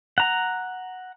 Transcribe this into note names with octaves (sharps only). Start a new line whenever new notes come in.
F#5 A#5